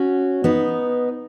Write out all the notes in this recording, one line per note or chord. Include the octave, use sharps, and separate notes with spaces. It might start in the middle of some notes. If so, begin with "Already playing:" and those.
Already playing: C#4 F#4
B3 D#4